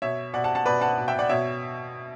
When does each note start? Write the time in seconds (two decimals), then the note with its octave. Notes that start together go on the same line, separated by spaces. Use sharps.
0.02 B2 C#5 E5
0.34 B2 D5 F#5
0.44 F#5 A5
0.55 F#5 A5
0.66 B2 B4 D5
0.81 F#5 A5
0.98 B2
1.08 E5 G5
1.19 D5 F#5
1.29 B2 C#5 E5